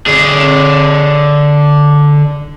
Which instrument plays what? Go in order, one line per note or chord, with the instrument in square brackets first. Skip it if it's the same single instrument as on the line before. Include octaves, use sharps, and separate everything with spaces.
[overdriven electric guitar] D3 G#4